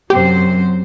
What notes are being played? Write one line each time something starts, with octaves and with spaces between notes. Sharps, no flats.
F#2 C3 F#3 G4 C5